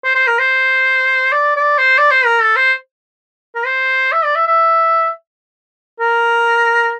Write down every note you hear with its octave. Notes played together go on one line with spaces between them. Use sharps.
C5
C5
A#4
C5
D5
D5
C5
D5
C5
A#4
A4
C5
A#4
C5
E5
D5
E5
E5
A#4